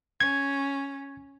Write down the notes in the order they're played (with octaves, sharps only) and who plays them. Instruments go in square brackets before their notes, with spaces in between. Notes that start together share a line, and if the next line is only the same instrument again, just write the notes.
[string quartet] C#4 [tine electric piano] G#6